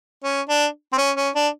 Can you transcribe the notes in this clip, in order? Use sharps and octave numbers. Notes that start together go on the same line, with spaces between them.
C#4
D4
C4
C#4
C#4
D4